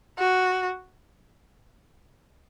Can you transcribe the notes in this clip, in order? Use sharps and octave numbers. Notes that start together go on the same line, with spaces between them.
F#4